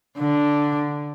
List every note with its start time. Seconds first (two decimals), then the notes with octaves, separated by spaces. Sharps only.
0.18 D3